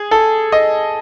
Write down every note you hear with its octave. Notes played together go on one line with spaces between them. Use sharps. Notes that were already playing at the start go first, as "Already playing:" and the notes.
Already playing: G#4
A4
D#5